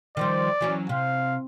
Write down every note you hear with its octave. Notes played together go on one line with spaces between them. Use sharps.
D#3 F3 G3 D5
E3 F#3 C#4
C3 F5